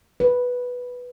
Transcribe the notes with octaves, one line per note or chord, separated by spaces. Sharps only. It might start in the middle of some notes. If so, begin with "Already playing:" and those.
B4